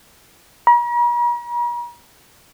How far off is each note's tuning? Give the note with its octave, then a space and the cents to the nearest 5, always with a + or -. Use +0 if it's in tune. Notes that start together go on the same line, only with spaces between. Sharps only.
A#5 +45